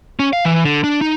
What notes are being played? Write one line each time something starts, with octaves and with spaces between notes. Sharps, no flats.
C#4
F5
E3
D3
D4
D#4